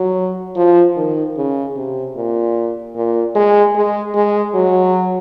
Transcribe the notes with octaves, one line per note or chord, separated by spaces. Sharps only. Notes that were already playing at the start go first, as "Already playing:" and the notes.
Already playing: F#3
F3
D#3
C#3
C3
A#2
A#2
G#3
G#3
G#3
F#3